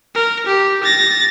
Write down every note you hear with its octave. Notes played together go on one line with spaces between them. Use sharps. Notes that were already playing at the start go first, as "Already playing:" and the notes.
A#4
G4
A6 A#6